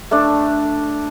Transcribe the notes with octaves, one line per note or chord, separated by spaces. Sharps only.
A3 D4